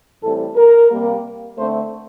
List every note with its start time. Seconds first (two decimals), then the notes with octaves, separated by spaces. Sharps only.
0.22 A2 E3 G3 C4 A4
0.56 A#4
0.90 C3 G3 A#3
1.58 D3 A3 C4 C5